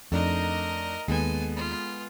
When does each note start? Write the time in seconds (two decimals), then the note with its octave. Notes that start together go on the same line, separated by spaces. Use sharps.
0.12 F2 A3 D4 D#4 A#4 D#5
1.08 D#2 G#3 B3 A4 G#5
1.56 F4